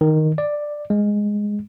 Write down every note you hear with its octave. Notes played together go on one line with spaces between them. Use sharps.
D#3
D5
G#3